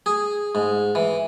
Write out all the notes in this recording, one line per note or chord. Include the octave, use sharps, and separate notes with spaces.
G#4
G#2
E3